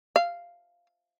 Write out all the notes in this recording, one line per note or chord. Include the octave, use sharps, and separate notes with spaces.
F5